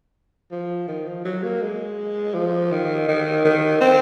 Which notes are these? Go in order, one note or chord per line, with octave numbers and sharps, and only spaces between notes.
F3
D#3
F3
F#3
A#3
G#3
F3
D#3
D#3
D#3
C4